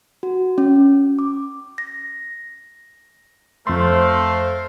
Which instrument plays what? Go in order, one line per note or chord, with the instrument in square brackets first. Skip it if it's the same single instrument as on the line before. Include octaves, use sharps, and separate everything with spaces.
[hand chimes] F#4
C#4
D6
A#6
[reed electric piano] F2 C6 [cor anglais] A3 [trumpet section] A4 A#4 F5 [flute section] C5